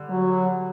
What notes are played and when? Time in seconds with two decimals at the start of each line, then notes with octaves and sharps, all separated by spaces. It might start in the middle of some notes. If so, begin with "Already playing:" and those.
Already playing: D3 G3
0.09 F#3